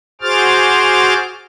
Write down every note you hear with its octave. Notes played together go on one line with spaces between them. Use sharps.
F#4 G#4 C5 D6 F6 A6